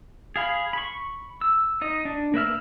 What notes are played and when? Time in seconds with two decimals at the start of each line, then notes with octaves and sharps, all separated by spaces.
0.36 G#4 F5 B5
0.73 B5 C#6
1.41 E6
1.81 D#4 D#5
2.05 D4
2.34 A#3 B4 E5 F6